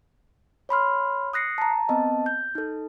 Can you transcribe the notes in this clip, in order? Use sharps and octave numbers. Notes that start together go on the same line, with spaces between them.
C#5 B5 C6 F6
D#6 F#6 A#6 C7 C#7
A5 A#5
B3 C4 D#5 A5
G6
D#4 A4